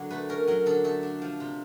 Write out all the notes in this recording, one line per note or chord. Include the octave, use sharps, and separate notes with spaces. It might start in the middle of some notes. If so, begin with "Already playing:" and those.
Already playing: D3 F#3
A3 B4
C#4 A#4
F#3 A#4
D3 A4
A3 A4
D4
F3
C3